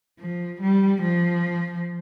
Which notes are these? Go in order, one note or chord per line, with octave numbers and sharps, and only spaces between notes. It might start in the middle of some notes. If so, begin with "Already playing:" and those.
F3
G3
F3